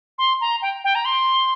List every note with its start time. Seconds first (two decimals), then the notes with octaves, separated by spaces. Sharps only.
0.18 C6
0.41 A#5
0.62 G5
0.84 G5
0.95 A#5
1.05 C6